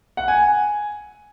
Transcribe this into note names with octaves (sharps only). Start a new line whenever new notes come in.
F#5
G#5